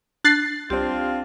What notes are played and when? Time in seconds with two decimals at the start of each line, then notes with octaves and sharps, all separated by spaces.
0.24 D4 F#6 A6 C7
0.70 C2 C4 D4 F4 G4 C5